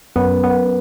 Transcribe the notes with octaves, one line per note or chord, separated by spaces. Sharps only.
F#2 B3
F#2 B3